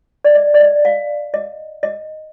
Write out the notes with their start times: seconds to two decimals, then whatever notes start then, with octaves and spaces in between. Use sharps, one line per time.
0.24 D5
0.35 D#5
0.54 D5
0.60 D#5
0.85 F5
1.34 D#5
1.83 D#5